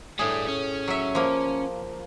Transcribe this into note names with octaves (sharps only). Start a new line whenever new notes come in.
A2 G3 D4 G#4
C#4
F#3 E5
F3 A#3